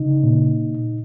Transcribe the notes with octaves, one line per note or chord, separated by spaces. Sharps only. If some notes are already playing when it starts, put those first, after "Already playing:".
Already playing: C#3 D#4
A#2